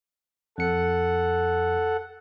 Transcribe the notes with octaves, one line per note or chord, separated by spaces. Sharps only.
F2 A4 F#5 C#7